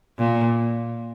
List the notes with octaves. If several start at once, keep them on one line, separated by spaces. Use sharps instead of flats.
A#2